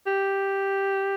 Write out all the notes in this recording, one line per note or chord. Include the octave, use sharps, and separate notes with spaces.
G4